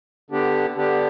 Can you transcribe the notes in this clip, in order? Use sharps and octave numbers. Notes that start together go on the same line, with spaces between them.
D3 B3 D4 G4
D3 B3 D4 G4